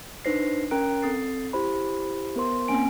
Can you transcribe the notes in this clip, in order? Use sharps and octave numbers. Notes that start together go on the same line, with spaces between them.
D4 D#4 B4 C5 A#6 C7
C#4 A#4 G5 A#5 F#6 D7
C4 A4 D#6 A6 C7
E4 G4 C5 B5
B3 A#4 C5 C6
A#3 C4 C#4 G#5 D7